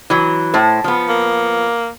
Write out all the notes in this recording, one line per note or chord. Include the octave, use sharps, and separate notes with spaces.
E3 F#3
A2 C5
F3 B3
A#3